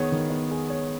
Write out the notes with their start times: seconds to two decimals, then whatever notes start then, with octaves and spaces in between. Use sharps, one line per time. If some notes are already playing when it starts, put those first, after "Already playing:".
Already playing: D#3 B3 G#4 C#5
0.12 D#3
0.30 B3
0.51 G#4
0.70 C#5